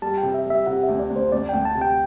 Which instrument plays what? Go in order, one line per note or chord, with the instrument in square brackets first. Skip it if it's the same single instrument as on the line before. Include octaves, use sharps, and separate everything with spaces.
[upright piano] G3 [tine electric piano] A5
[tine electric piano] G5
[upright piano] C3
[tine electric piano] E5
[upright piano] G3 [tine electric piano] E5
[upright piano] C3 [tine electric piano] F#5
[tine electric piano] E5
[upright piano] D2
[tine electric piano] D5
[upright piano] D2
[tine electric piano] C5
[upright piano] D2 [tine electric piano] D5
[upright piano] D2 [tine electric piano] G5
[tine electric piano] A5
[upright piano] C3
[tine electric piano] G5